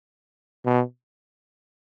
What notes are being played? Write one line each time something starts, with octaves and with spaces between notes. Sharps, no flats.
B2